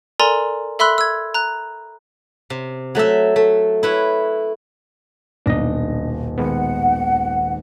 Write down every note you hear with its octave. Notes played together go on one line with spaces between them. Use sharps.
A4 A#4 D5 G#5 A#5 C6
A4 E5 B5 C6 E6 F#6
E6 G#6
A#5 F#6
C3
F#3 A3 A4 E5
A3
E4 B4 C#5
D#1 B1 D4 D#5 A#6
D#3 G#3 B3 F#5